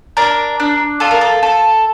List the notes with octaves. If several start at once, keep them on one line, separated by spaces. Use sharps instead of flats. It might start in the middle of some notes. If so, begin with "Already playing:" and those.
D4 A#4
D4
F4 A4
A#4
A4
A4